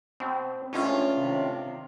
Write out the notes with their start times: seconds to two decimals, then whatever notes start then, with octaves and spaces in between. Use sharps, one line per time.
0.20 B2 C4
0.73 G1 C#2 A2 C#4 D4 F4
1.16 C3 D#3